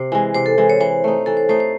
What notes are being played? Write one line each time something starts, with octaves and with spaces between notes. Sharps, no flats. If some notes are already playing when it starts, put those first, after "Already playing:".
Already playing: C3 C5
E3 G#3
C3 C5
A4
E3 G#3
C#5
E3 C5
A3 D#4
E3 A4
C5
A3 D#4 C5
C5